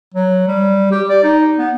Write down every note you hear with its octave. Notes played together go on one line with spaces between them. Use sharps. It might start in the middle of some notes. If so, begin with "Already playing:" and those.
F#3
G3
G4
D5
D#4
B3